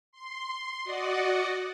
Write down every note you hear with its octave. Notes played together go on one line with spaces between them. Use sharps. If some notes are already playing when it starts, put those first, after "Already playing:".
C6
F#4 D5 D#5 F#5